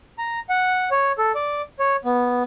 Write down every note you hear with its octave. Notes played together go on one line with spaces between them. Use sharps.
A#5
F#5
C#5
A4
D5
C#5
B3